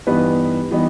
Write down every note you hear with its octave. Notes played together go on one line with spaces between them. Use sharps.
G2 E3 G3 B3 D#4 B4
E3 G3 B3 D#4